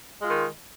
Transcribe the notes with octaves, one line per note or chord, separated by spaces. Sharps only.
D#3 G#3 F4